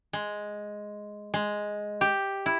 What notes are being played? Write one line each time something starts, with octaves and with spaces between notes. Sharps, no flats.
G#3
G#3
G4
E4